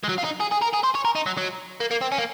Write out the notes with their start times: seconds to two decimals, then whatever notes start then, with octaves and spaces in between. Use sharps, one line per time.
0.04 G#3
0.09 F#3
0.19 F4
0.24 D#4
0.41 G#4
0.52 G#4
0.62 A#4
0.74 G#4
0.84 C5
0.95 C#5
1.05 A#4
1.15 D#4
1.26 F#3
1.38 F#3
1.80 A#3
1.91 A#3
2.01 C4
2.12 C#4
2.18 A#3